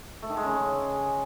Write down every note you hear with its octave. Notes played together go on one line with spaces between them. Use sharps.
A3
D#3
G#3
C#3